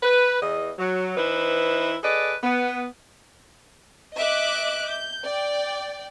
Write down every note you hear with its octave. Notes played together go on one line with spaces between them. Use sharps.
B4
E2 D#5
F#3
E3 D#4 E4 B4 C5
G#4 A4 B4 D5 D#5
B3
D#5 E5 D6 F#6
G6
D5 G5